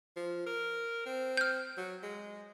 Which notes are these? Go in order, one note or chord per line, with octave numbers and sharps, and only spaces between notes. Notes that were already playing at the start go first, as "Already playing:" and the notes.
F3
A#4
C4
F6 G6
F#3
G#3